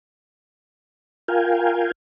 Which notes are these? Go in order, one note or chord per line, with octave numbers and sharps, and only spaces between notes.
F4 A#4 F5 G5 G#5